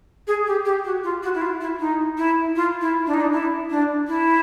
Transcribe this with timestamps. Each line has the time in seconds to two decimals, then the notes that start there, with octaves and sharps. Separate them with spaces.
0.27 G#4
0.46 G4
0.65 G4
0.84 F#4
1.03 F4
1.22 F#4
1.34 E4
1.41 F4
1.60 E4
1.79 D#4
2.17 E4
2.55 F4
2.81 E4
3.06 D4
3.13 D#4
3.20 D4
3.32 E4
3.70 D4
4.07 E4